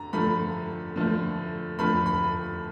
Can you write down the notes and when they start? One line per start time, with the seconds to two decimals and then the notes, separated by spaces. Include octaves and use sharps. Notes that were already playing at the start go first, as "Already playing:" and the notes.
Already playing: D3 A#5
0.13 D3 F3 A3 B5
0.96 D3 F3 A3
1.79 D3 F3 A3 B5
2.06 B5